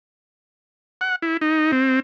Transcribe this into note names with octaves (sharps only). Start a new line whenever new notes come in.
F#5
E4
D#4
C4